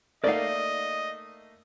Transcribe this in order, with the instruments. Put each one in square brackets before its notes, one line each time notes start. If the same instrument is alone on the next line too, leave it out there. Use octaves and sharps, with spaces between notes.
[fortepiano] A3 A#3 D#4 [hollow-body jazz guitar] D5 F5 [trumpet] D#5